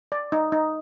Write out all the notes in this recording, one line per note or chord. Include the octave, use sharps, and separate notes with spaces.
D5
D#4
D#4